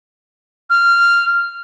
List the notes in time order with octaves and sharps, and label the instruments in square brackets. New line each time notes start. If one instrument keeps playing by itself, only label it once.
[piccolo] F6